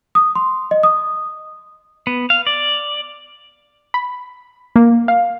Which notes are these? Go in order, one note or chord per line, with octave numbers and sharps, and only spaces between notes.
D#6
C6
D#5
D#6
B3
F5
D5
B5
A#3
F5